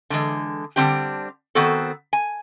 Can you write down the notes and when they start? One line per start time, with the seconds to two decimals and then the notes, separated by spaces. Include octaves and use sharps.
0.10 D3 E3 G#3
0.76 D3 G3 C4 D4 G4
1.55 D#3 B3 C4 F#4 A4
2.13 G#5